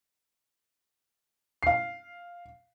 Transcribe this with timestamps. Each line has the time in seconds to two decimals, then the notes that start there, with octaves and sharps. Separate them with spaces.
1.63 F5 C7